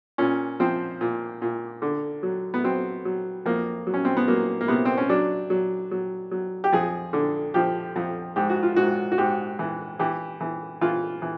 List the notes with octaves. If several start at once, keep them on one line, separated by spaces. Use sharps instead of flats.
A#2 C#4
F3 C4
A#2
A#2
D3
F#3
B3
F#3 C4
F#3
F2 A#3
F#3
C#4
C4
B3
F#3 A#3
A#3
C3 B3
C4
C#4
F#3 D4
F#3
F#3
F#3
G4
F2 G#4
D3
F3 G4
F2
G#2 G4
F#4
F4
G#2 F#4
F#4
G#2 G4
E3
E3 G4
E3
E3 F4
E3